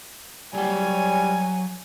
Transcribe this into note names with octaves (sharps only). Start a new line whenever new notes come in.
F#3 G3 C#5 G5 G#5